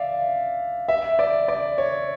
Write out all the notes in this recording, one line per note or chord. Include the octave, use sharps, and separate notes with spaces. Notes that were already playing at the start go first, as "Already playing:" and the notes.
Already playing: D5 E5 F5
E5
D5
D5
C#5